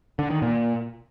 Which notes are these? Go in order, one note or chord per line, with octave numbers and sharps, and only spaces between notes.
D3
D#3
A#2